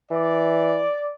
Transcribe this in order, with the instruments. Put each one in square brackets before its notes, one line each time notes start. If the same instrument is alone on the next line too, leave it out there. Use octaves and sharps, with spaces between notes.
[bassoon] E3 [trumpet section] D5